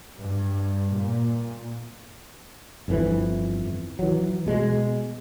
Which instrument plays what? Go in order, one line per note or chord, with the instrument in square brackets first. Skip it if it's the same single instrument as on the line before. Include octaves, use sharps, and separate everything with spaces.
[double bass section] G2
A#2
[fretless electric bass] G1 F2 A2 E3
E3 F#3
B2 G#3